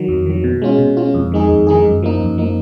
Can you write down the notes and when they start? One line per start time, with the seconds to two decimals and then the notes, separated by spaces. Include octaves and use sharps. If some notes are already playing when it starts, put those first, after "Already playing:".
Already playing: D#3 F#3
0.08 F2
0.26 D#3 F#3
0.44 B2
0.62 G#3 C#4 F4
0.78 B2
0.97 G#3 C#4 F4
1.14 F2
1.32 D#3 G#3 D#4 G#4
1.49 F2
1.67 D#3 G#3 D#4 G#4
1.85 F#2
2.02 F3 A#3 D#4
2.20 F#2
2.38 F3 A#3 D#4